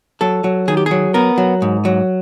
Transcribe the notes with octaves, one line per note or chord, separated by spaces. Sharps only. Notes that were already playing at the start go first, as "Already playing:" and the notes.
F#3 A4
F#3
D#3 G#4
G4
F#3 G#4
B3 A#4
F#3
G#2
F#3